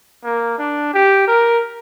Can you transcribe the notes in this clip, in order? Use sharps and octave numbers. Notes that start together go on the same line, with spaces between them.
A#3
D4
G4
A#4